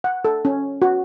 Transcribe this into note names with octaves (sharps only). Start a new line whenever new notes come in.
F#5
A4
C#4
F#4